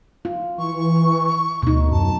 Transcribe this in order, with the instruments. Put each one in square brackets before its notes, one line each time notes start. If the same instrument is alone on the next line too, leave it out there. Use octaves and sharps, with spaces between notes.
[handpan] F4
[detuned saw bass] E3 [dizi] C#6
[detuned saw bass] D2 [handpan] B2 D#4
[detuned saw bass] F#2 [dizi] A5